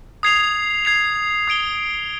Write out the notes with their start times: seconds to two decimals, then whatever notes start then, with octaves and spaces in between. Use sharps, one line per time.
0.23 D#6 G#6 C7 F7
0.85 G#6 C7 F7
1.48 D#6 G#6 D7 G7